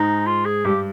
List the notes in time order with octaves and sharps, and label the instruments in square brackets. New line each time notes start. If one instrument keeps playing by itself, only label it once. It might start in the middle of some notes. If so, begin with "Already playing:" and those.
Already playing: [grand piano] G#2 G#3 [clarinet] D#4
[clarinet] F4
G#4
[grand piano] G2 G3 [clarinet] G4